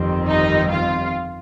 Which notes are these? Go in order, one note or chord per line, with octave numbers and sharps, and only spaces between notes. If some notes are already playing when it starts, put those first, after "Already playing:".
Already playing: G1 F2 D#3 G3 C4
D#4 D#5
F4 F5